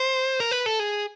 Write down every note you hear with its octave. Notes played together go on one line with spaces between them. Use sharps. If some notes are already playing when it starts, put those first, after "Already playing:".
Already playing: C5
A#4
B4
A4
G#4